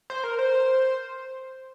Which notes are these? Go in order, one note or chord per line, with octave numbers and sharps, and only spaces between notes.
C5
A#4
C5